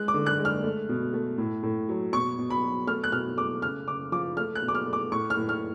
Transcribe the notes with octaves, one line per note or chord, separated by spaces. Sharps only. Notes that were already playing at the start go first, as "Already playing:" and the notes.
Already playing: G#3 F#6
D6
D3
F#6
G#3
F6
A3
B2
A3
A2
A2
F#3
B2 C#6
B2
B5
F#3
A3 F6
F#6
B2 F6
A3 D6
C#3 F6
C#3 D6
F3 D6
A3 F6
F#6
B2
D6
F6
A3
D6
A2 C#6
F6
A2
F6